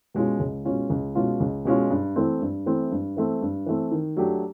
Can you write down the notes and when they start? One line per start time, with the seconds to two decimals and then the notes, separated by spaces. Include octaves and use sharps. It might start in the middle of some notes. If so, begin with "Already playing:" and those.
0.14 B2 G#3 C#4 F4
0.40 C#2
0.65 B2 G#3 C#4 F4
0.90 C#2
1.15 B2 G#3 C#4 F4
1.40 C#2
1.65 B2 G#3 C#4 F4
1.90 G2
2.16 E3 A3 C4
2.41 G2
2.66 E3 A3 C4
2.91 G2
3.17 E3 A3 C4
3.42 G2
3.66 E3 A3 C4
3.91 D#3
4.17 F#3 A3 D4 G4